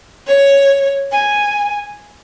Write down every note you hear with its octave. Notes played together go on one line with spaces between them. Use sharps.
C#5
G#5